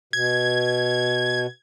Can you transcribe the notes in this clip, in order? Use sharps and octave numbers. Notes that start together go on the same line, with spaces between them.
B2 G#6